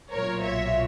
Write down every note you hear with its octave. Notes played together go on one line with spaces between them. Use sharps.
B1 A#2 F#3 A#4 C#5
C#5 E5